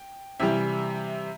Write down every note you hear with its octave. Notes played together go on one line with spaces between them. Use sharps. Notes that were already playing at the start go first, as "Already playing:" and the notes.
Already playing: G5
C3 E3 G3 E5